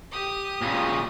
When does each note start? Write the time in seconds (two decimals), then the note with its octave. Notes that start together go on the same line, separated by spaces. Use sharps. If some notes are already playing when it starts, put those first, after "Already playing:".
0.12 G4 D#6
0.62 A#2 C#3